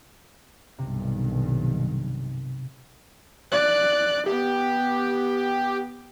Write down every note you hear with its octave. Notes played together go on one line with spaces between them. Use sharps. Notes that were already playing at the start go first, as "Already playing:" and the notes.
B1 G2 C3 D#3
D5 F#6
B3 G4